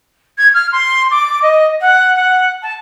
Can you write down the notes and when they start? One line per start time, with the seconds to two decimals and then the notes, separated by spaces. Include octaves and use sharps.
0.37 G#6
0.53 F6
0.72 C6
1.10 D6
1.42 D#5
1.80 F#5
2.15 F#5
2.62 A5